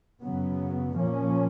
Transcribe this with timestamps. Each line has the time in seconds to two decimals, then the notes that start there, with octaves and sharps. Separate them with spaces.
0.20 F#2 C#3 F#3 B3
0.96 A#2 F3 A#3 C#4